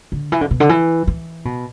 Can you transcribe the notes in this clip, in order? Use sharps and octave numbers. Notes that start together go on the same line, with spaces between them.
D3
E3
D3
B2
D3
E3
E3
B2